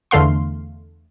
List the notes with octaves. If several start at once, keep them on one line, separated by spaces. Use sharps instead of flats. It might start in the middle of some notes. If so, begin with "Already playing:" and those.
E2 D3 A3 F5 C6